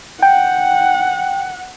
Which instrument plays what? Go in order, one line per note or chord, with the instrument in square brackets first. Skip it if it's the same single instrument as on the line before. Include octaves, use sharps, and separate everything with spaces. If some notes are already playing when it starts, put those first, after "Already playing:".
[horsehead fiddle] F#5 [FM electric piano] G5